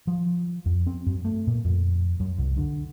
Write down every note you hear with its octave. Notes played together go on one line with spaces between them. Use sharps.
F3
F2
C4
F#2
A3
A#2
F2
F#2
C2
D3